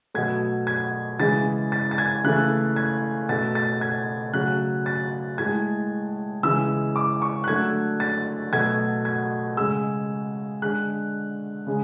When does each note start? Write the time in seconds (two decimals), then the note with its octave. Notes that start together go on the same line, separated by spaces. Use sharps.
0.14 B2 F#3 A3 G#6
0.67 G#6
1.19 C#3 E3 G#3 A6
1.72 A6
1.91 A6
1.98 G#6
2.24 C#3 E3 A3 F#6
2.76 G#6
3.29 B2 A3 A6
3.55 A6
3.81 G#6
4.33 C#3 F#3 A3 F#6
4.86 A6
5.38 A2 G#3 G#6
6.43 C#3 E3 G#3 E6
6.96 D6
7.22 C#6
7.44 F#6
7.48 D3 F#3 A3 G#6
8.00 A6
8.53 B2 F#3 A3 G#6
9.05 G#6
9.57 C#3 G#3 E6
10.62 D3 G#3 F#6
11.67 C#3 G#3